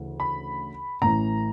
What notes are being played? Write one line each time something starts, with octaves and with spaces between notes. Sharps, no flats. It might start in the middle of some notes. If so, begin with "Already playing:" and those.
Already playing: D2 C#3 E3
B5
A1 A2 E3 A#5